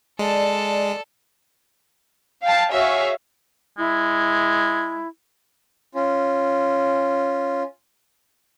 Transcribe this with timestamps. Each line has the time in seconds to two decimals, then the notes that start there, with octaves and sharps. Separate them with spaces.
0.19 G#3 A4 D5 A5
2.42 F5 G5 A5
2.71 F#4 G#4 C#5 E5 F5
3.78 G#3 E4
5.95 C#4 F4